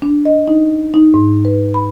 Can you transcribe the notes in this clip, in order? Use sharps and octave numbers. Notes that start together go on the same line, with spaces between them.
D4
D#5
D#4
D#4
G#2
B4
B5